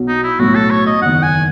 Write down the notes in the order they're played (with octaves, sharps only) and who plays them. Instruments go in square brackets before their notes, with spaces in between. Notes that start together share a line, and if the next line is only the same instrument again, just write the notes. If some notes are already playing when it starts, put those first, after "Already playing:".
Already playing: [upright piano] B1 B2 F#3
[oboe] D#4
E4
[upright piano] B1 A2 F#3 [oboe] F#4
[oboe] A4
C#5
D#5
[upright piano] F#1 E2 D#3 [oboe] F#5
[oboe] G#5